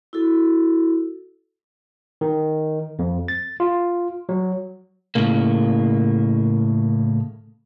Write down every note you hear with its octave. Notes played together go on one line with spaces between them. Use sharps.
E4 F#4 A4
D#3
F2
A6
F4
F#3
A2 C#3 A#3